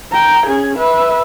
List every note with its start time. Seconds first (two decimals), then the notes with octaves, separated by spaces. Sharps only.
0.12 G5 A#5
0.47 C#4 G#4
0.78 B4 E5